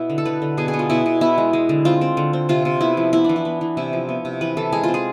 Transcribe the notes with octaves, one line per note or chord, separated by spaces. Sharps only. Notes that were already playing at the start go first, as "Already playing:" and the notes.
Already playing: B2 B3 E4
D3
A4
D3 B4
D3
B2 G#4
G#4
B3
F4
B2 E4
B2
B3 E4
G#3
G#3
D3
C4 F4
C4
D3
C4
C3 F4
C3
B3 E4
F3
B3 E4
E3 D4
E4
B3
E3
C3 E4
F3
B3
C3
E3 B4
E3 A4
G#3 G#4
C4 F4
G#4